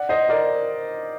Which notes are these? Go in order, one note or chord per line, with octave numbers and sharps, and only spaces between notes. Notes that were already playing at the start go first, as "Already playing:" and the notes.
Already playing: D5 F#5
C5 D#5
A#4 D5